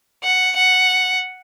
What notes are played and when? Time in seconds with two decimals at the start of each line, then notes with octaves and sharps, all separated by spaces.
0.24 F#5
0.56 F#5